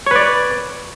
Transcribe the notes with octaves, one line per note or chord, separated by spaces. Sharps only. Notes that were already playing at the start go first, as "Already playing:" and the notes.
B4 C#5 D5